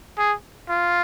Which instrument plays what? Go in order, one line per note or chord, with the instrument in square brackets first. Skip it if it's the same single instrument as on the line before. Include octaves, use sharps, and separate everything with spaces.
[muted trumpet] G#4
F4